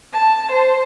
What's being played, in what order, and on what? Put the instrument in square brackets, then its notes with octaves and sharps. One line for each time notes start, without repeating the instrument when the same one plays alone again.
[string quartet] A5
C5